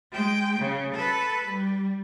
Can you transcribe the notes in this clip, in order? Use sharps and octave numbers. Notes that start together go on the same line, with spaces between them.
G#3 G5
C#3
A4 B4
G3